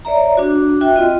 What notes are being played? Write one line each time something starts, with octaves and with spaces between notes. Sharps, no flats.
C#5 D5 E5 A#5
D4 F#4
F#4 E5 G5
C4 F4 D#5